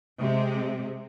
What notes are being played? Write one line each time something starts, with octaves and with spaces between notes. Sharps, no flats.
C3 G#3